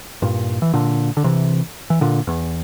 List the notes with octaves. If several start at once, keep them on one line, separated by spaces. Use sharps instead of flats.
G2 A#2
E3
A#2 D3
D3
C3 E3
E3
A#2 D3
E2